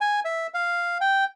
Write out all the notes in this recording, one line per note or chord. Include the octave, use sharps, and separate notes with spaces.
G#5
E5
F5
G5